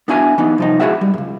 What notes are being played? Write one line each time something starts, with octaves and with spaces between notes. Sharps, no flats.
B3 D4 E4 F#4 G#5
E3 B3 D#4
C2 F3 D#4
G#3 E4 F#4 G#4 E5 F#5
G3
C#2 F#2